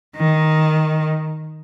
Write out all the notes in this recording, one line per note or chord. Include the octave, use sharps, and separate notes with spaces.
D#3